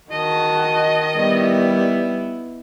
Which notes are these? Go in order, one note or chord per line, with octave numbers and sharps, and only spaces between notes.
D#3 F#4 D#5 A5
G3 B3 E4